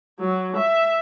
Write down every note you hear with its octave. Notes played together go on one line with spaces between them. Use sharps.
F#3
E5